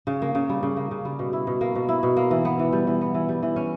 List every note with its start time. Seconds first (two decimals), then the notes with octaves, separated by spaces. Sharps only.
0.07 C#3
0.22 A#3
0.35 C#3
0.49 G3
0.63 C#3
0.77 A#3
0.91 C#3
1.05 G3
1.19 B2
1.33 E4
1.47 B2
1.61 A#3
1.75 B2
1.89 E4
2.03 B2
2.17 A#3
2.31 E3
2.45 B3
2.59 E3
2.73 G3
2.87 E3
3.01 B3
3.14 E3
3.29 G3
3.43 E3
3.56 C#4